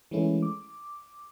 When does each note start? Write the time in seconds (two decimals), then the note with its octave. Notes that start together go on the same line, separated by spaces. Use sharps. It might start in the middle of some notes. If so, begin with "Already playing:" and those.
0.11 E3 G#3 A3 C#4 E4
0.42 D6